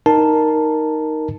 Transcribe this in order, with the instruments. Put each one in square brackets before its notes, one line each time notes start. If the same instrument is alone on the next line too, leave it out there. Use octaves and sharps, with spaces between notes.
[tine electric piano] D#4 A#4 A5